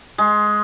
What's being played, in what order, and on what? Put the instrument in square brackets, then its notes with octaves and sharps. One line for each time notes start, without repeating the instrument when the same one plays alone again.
[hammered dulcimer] G#3